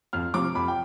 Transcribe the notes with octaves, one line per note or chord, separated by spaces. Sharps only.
F2 F6
C3 F3 D6
F2 B5
G5